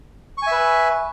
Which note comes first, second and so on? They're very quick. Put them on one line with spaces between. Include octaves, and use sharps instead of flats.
C#6 G#5 E5 B4